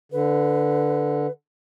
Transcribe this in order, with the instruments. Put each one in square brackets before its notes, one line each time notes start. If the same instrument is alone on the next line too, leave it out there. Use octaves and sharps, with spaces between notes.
[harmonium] D3 [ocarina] B4